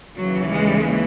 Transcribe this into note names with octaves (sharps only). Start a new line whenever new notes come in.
D#2 C#3 E3 F#3
G#3